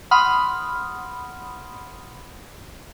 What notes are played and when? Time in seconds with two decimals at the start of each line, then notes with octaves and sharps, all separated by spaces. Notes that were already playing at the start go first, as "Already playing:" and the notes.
0.11 F#5 B5 C6 D#6 F6